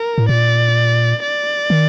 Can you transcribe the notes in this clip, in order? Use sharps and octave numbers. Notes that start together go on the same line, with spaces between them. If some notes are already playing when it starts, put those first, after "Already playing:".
Already playing: A#4
A2
A#2 D5
D5
D#3